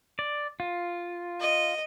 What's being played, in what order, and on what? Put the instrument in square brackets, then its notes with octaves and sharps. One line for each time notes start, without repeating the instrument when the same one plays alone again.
[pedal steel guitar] D5
F4
[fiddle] D#5